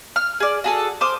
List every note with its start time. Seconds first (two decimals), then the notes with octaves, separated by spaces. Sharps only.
0.16 F6
0.40 G#4 D5
0.64 F#4 G#4 A4
1.01 C5 D6 D#6 F6